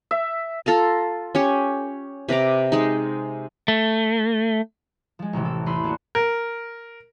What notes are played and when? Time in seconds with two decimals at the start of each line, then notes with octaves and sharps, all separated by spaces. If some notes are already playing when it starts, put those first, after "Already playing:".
0.11 E5
0.66 F4 A4 F5 A#5
1.35 C#4 G4 C#5
2.29 C3 B4 A#5 D6
2.72 G#3 D#4
3.68 A3
5.19 F3 G#3
5.33 A1 C3 E3 C4
5.45 A4
5.66 E2 A3 B4 B5 C6 D#7
5.84 A#3 D4 F#4
6.15 A#4